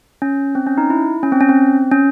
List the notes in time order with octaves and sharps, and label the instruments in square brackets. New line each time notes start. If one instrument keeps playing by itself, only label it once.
[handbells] C#4
C4
C#4
D#4
E4
C#4
C4
C#4
C4
C#4